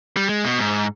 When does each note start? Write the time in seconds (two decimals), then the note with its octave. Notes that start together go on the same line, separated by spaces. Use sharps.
0.17 G3
0.29 G#3
0.44 B2
0.59 G#2